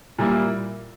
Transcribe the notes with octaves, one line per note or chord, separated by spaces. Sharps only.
A#2 G3 A#3 E4